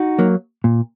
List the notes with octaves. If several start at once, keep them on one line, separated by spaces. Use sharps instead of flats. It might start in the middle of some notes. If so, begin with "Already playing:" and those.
Already playing: D#4 F#4
F#3 A#3
A#2